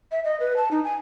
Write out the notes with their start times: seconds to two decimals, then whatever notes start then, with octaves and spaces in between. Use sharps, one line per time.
0.12 E5
0.24 D#5
0.40 B4
0.57 A5
0.71 D#4
0.84 G#5